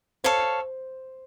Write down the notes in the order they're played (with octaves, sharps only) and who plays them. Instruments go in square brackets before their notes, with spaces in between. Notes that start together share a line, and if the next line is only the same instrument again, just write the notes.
[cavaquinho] A4 C#5 F5 [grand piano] C5